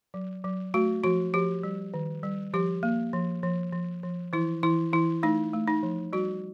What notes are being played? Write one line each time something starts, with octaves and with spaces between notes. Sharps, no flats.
F#3
F#3
A3 F#4
F3 F#4
F3 G4
G3
D#3
G3
F3 G4
A#3
F3
F3
F3
F3
E3 E4
E3 E4
E3 E4
A3 D#4
A3
D#4
F3
G3 F#4